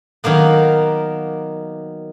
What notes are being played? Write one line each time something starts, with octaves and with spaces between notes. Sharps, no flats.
D#3 F#3 A#3 B3